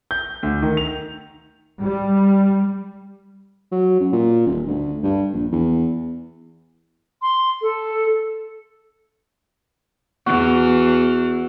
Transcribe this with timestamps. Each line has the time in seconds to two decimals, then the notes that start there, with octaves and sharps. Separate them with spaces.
0.11 G6
0.43 D2
0.62 D#3
0.77 F7
1.82 G3
3.72 F#3
4.00 F#2
4.13 A#2
4.47 D#1
4.67 D2
5.03 G2
5.34 A#1
5.52 E2
7.22 C6
7.62 A4
10.26 E2 E3 F#4